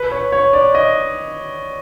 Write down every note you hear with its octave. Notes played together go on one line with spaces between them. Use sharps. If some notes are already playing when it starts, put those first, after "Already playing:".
Already playing: B4
C#5
C#5
D5
D#5